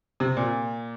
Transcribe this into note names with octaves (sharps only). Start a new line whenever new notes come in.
C3
A#2